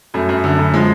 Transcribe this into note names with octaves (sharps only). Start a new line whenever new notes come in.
F#2 A3
F#2
D3
F#2
F3 G#3